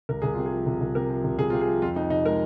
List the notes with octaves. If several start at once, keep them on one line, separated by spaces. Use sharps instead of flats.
C2 A#4
C2 G#4
C3 F4
G#4
F3
C2
C2
C3 A#4
F3
C2
C2 G#4
C3 F4
G#4
F3
F2 F4
F2 D#4
C3 D#4
G#3 A#4